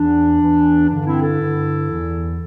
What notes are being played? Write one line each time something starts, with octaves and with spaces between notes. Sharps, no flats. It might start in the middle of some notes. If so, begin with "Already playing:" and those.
Already playing: E2 E3 D4
E2 E3
G2 D3 D4
C4 E4
E4 A4
G2 D3
E2 E3